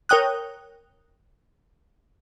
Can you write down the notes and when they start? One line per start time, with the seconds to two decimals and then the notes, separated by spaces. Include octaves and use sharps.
0.09 A#4 C#5 G5 D#6 F#6